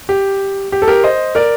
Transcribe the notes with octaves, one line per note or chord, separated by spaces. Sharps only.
G4
G4
A4
G4 A#4
C5 D#5
A#4 D5